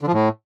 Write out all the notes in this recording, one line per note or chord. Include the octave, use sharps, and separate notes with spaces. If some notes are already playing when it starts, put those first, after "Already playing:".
D3
F3
A2